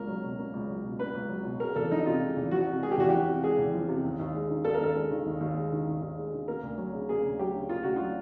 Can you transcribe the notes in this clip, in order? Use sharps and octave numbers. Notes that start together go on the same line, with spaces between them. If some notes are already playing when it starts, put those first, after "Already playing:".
Already playing: C#2 B2 A#3 A#4
F#3
B2
A#3
C#2
F#3
B2
A#3 B4
C#2
F#3
B2
G#3 A#4
E2 A4
F3 D#4
C3 F4
G#3
E2
F3 F#4
C3
G#3 G#4
G4
E2 F#4
F3 G4
C3
G#3 G#4
E2
F3
C3
D#2
D#2
G#3
D#3
D#2 A4
A#4
D#2 A4
G#3
D#3
D#2
D#2
G#3
D#3
D#2
D#2
G#3
D#3
A#3 A#4
D2
F#3
C#3
A#3 G#4
D2
F#3 G4
C#3
A#3 F4
D2 F#4
F#3 F4